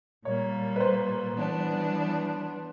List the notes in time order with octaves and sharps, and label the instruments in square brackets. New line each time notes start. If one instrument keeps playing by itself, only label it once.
[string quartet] A#2 G3 A#3 [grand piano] C#5
[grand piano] B4
C5
[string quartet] E3 G3 B3 D4